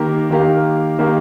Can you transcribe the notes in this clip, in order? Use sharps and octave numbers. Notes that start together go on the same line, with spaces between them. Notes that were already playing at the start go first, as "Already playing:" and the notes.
Already playing: D#3 A#3 G4 A#4 F5
D#3 A#3 G4 A#4 F5
D#3 A#3 G4 A#4 F5